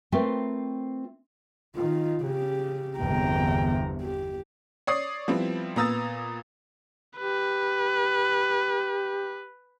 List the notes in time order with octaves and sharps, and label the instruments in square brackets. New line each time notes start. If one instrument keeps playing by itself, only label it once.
[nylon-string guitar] A3 C4 F4 A#4 B4 G5
[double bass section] D#3 [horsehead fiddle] F4
[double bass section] C#3 [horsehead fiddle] G4
[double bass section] G1 E2 C3 [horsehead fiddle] G5 A#5
[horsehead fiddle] G4
[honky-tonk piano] C#5 D5 D#6 C7
F3 G3 B3 C4 E4
A#2 B3 A#5 D#6 E6 A6
[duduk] G4 [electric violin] B4